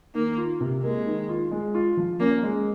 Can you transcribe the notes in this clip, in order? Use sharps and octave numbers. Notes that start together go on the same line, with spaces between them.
D#3 A#3
F4
C3
G#3 A#3
D#3
F4
G#3
F4
F3
A#3 C#4
G#3